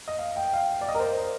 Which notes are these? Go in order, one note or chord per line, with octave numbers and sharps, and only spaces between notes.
D#5
F5
G5
F5
D5
D#5
A#4
C5